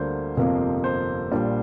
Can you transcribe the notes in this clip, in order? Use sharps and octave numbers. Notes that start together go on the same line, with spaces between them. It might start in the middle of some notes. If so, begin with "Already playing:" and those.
Already playing: D2 D3 G3 A#3 D4 C5
G1 F2 C3 F3 A#3
C5
A#1 A#2 G3 D4